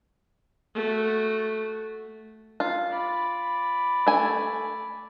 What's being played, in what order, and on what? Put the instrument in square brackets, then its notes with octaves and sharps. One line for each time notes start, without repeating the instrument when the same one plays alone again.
[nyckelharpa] A3 F#4
[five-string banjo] F4
[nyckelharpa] D5 B5
[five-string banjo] A3 G#5